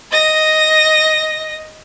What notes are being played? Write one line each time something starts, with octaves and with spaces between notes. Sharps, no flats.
D#5 A#6